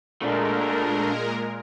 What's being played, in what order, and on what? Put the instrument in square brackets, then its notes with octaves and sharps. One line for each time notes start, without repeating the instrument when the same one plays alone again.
[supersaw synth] A#2 G#3 A#4 [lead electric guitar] A3 D4